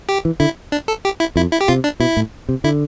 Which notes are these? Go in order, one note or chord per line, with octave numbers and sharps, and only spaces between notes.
G4
E3
D3 E4
D4
A4
G4
E4
F2 E4
E4
G4
C3 F4
D4
B2 E4
A2
C3
D3 E4